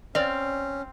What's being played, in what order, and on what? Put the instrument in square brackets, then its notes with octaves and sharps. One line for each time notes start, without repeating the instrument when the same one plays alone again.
[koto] C4 F5 [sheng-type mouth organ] C#4 [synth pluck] D5